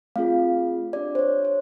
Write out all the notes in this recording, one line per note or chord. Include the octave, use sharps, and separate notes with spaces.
A3 C4 F4 G#4 F5
D4 G4 D5
C5
C#5
C5